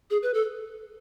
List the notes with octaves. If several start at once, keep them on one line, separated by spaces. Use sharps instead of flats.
G#4
B4
A4